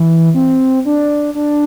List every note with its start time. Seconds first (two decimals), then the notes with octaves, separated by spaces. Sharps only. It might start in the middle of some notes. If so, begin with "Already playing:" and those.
Already playing: E3
0.34 C4
0.85 D4
1.35 D4